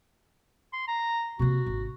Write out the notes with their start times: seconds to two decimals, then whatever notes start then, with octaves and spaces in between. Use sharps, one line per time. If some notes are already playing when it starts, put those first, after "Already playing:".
0.73 C6
0.88 A#5
1.39 C3 A#3 F#4
1.66 G#1